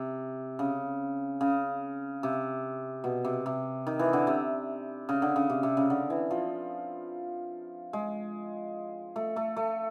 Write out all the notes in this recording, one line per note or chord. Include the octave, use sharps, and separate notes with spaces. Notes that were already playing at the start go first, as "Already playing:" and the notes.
Already playing: C3
C#3
C#3
C3
B2
C3
C3
D#3
E3
D3
C3
C#3
D3
C#3
C3
C3
C#3
D3
E3
F3
G#3
A3
A3
A3